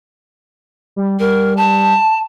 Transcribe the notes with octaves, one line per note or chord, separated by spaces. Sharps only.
G3
G3 A#4
A5